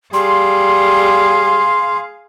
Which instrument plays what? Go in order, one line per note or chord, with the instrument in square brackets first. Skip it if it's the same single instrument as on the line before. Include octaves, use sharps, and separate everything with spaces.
[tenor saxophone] G3 [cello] G#4 F5 [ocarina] C6